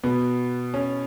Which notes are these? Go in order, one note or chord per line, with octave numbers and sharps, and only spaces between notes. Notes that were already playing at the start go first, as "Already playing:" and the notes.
B2 B3
C#4